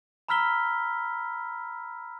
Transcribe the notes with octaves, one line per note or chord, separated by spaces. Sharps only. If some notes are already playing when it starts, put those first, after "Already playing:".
A#5 B5 E6 F6 B6 G7